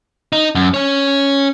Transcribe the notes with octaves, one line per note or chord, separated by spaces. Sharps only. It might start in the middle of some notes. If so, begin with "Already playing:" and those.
D#4
F#2
C#4 C#5